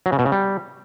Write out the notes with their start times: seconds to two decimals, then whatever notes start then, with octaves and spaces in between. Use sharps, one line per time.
0.06 F#3
0.12 C#3
0.19 B2
0.25 C#3
0.32 G3